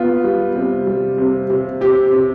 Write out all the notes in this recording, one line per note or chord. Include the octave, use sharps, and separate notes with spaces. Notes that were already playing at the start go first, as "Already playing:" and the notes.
Already playing: B3 F4
G3
C3
G3
C3
C3
C3 G4
C3